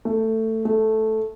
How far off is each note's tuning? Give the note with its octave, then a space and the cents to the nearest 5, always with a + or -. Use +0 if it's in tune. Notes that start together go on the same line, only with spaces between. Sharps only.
A3 +15
A3 -5